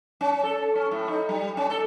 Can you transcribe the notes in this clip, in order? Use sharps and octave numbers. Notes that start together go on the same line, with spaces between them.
C#4
A4
C#4
A2
D#4
G3
C#4
A4